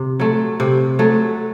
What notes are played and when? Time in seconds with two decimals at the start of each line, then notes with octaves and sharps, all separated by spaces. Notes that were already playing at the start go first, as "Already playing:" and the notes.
Already playing: C3
0.20 F#3 A3
0.60 C3
0.99 F#3 A3